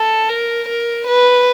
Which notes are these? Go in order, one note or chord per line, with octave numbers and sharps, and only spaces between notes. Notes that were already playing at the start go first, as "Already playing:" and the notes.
Already playing: A4
A#4
A#4
B4